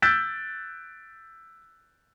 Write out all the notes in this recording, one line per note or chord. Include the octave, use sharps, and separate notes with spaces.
E6 F#6 G6 A6 B6 D7